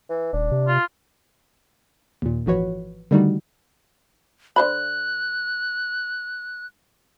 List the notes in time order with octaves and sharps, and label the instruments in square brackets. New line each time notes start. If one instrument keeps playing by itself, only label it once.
[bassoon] E3
[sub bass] D#1 [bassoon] D4
[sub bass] C3
[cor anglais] F4
[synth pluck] D#2 A#2
G#1 E3 F3 F#4 B4 C#5
D3 D#3 G3 A3 D#4 F#4
[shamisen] D3 C5 B5 [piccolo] F#6